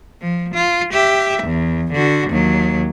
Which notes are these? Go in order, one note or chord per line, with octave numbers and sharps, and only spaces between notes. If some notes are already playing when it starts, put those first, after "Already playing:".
F3
F4
G4 E5
E2
D3 F#4
D#2 F#3